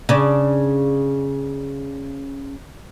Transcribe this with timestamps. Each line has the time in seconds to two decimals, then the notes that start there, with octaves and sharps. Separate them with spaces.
0.09 C#3 D4